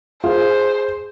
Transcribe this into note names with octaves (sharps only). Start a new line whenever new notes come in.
F4 G#4 C5